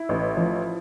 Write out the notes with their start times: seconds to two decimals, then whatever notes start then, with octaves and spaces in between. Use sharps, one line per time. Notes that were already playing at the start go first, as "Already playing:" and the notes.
Already playing: E4
0.09 A1
0.37 F3